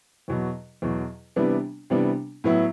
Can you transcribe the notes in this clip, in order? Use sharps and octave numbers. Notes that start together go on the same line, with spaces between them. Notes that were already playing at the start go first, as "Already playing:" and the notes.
E2 B2 F#3
E2 B2 F#3
C3 E3 G3 B3 D4
C3 E3 G3 B3 D4
A2 F#3 B3 E4